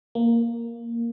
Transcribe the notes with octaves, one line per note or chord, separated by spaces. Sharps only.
A#3